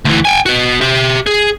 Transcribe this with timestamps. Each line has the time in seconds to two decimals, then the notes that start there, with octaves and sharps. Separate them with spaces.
0.05 D2 E3
0.25 G5 G#5
0.46 F#4 B4
0.81 G4 E5
1.27 G#4